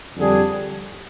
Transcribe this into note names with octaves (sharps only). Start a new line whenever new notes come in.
F2 D3 G3 D4 G#4